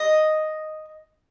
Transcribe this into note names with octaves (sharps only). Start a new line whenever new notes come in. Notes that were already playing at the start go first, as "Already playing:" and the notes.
Already playing: D#5